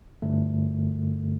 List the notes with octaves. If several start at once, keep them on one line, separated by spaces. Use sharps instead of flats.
G2 D3 A3